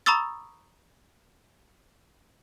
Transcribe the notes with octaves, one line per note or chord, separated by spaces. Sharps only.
A#5 B5 C#6 D#6 E6 A6